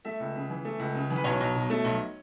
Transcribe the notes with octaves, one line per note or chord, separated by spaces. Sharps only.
A3 E5
C#2
C#3
E3
A3
C#2
C#3
E3
B4
B1 C#5
B1
B2
A3
B1